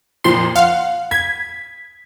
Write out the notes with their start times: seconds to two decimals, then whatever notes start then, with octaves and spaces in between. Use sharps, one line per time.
0.24 F2 A#2 F3 C6
0.56 F5 F#5
1.11 G#6 B6